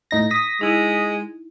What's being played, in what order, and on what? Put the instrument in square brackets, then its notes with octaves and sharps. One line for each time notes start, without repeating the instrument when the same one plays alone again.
[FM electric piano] A2 D#4 A#6
D#6 A#6 B6
[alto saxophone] G#3 [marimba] D#4 E4